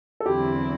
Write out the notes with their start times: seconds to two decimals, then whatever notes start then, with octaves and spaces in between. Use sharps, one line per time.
0.20 A4
0.26 E2 D3 F#3 C4 E4 G4